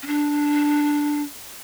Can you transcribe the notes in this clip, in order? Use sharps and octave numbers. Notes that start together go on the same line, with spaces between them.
C#4
D4